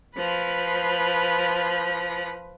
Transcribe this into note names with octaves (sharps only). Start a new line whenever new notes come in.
F3 B4